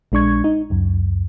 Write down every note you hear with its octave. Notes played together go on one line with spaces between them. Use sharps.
A#1 G#3 D4 C#6 G#6
D#4
C#2 F#2